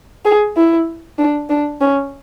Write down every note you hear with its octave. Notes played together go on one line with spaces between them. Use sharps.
G#4
E4
D4
D4
C#4